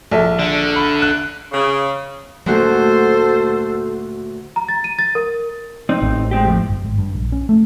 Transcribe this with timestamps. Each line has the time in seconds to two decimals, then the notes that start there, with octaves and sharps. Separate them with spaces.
0.11 A#1 A4
0.39 D3
0.76 B5
1.02 F#6
1.52 C#3
2.46 D2 A#2 F#3 A3 F#4 A4 C5
4.56 A#5
4.68 A6
4.84 D#7
4.99 A6
5.15 A#4
5.89 C4 D#4
6.02 A1
6.31 G#3 C4 G4
6.44 F2 A2
6.68 G1
6.85 G#1
6.98 G2
7.15 A#1
7.32 C#4
7.49 A3